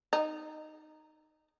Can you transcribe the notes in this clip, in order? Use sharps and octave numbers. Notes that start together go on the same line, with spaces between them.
D#4